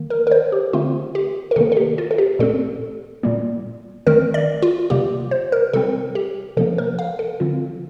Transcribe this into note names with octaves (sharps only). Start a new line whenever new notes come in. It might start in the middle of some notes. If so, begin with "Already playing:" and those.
Already playing: D#3 A#3
A#4
A#4
C5
G4
D3 A3 C4 F4
G4
A#4
C3 D#3 A#3 A4
A4
G4
F4
A4
G4
A#2 A3 C4 A4
A#2 G3 A#3
D#3 A3 C4 A#4
D5
F4
C3 G3 A#3 G4
C5
A#4
C3 G3 C4 A4
G4
C3 F3 A#3 A4
A#4
F5
A4
D3 F3 C4 F4